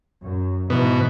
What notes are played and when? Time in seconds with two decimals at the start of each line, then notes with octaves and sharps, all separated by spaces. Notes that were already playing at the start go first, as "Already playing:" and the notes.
0.24 F#2
0.70 G#2 B2 E3